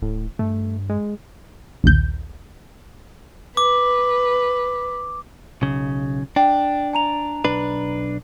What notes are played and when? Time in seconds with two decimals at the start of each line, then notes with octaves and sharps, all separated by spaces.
0.02 D1 A2
0.39 G2 A3
0.90 G#3
1.84 A#1 D#2 G6
3.57 B4 D6
5.62 B1 C#3
6.36 D4 G5
6.93 G#5 A#5 F7
7.45 B1 D4 B4